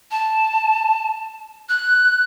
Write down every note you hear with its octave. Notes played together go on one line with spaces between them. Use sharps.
A5
F#6